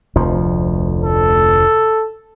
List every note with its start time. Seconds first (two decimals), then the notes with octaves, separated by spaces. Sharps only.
0.16 F1 D2 F3
1.04 A4